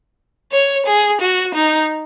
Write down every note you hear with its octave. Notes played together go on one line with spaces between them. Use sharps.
C#5
G#4
F#4
D#4